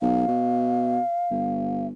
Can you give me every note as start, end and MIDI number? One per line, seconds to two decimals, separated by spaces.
0.02 0.24 35
0.02 1.87 77
0.28 0.99 47
1.30 1.93 31